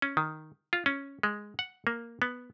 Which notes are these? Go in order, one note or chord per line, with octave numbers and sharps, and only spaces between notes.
C#4
D#3
F4
C#4
G#3
F#5
A#3
B3